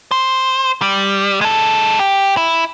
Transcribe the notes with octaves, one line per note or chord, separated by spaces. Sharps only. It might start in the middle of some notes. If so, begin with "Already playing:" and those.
C5
G3
G#3 A4
G4
E4